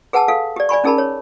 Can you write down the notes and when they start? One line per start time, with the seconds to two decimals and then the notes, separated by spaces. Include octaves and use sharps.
0.13 G#4 B4 F#5 G#5 A5 E6
0.28 A4 F5
0.56 G4 D5
0.69 D5 G#5 B5 C#6
0.84 C#4 D#4 G#4 A#4 A5 B5
0.98 C#5